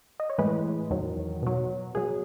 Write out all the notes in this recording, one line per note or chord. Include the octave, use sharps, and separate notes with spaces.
D#5
C#5
A2 E3 G#3 B4
E2 D#3 F#3
B2 F#3
B2 F#3 G#4